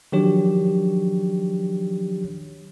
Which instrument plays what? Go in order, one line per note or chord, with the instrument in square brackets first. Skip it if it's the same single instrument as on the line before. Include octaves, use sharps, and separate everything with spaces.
[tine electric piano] D#3 F3 F#3 D4 G4 C#5